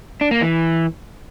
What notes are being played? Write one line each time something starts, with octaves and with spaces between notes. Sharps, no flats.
D4
A#3
E3